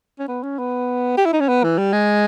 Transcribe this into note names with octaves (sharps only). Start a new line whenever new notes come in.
C#4
B3
C#4
B3
G4
E4
D#4
C#4
B3
E3
G3
G#3